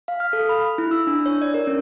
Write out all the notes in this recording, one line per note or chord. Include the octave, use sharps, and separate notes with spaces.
F5
F6
A4
B5
E4
E6
D4
C#5
D5
A#4
C#4